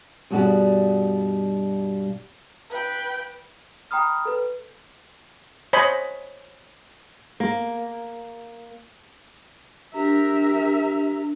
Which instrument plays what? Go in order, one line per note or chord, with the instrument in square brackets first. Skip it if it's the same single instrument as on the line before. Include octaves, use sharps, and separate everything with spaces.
[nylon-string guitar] G2 B2 G3 F#4 G#4 D5
[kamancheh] B4 G5
[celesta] G5 A#5 B5 D#6 F6
A4 B4
[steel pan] C5 C#5 D#5 G#5 B5
[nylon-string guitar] A#3
[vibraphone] D4 [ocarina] G4 [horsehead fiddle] A#4 E5 [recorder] A#5